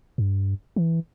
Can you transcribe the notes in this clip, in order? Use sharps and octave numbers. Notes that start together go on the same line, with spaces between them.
G2
E3